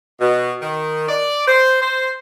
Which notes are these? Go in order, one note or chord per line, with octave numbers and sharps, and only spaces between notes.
B2
D#3
D5
C5
C5